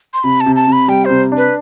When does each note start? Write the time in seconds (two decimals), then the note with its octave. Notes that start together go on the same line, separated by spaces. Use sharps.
0.14 C6
0.24 C3 B5
0.41 A5
0.46 C3
0.56 A5
0.67 C3
0.72 B5
0.88 G3 G5
1.05 C3 C5
1.32 D4
1.37 B4